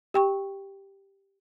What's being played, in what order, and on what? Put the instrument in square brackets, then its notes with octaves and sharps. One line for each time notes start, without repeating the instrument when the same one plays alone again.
[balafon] G4 G5 C#6